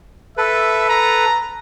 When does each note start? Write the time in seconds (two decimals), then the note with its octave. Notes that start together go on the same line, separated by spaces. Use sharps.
0.37 A4 B4 E5
0.89 A#5